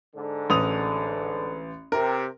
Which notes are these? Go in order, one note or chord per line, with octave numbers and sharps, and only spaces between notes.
G#2 D3
A1 D#6 F7
C3 A#4